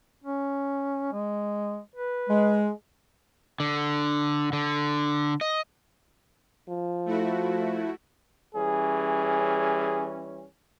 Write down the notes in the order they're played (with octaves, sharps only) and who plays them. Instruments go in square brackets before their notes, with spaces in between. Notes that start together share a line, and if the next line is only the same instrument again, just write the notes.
[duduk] C#4
G#3
B4
[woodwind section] G#3
[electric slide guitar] D3
D3
D#5
[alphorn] F3
[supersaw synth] A3 E4 F#4
[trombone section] E3 G3 C#4 [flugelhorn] G#4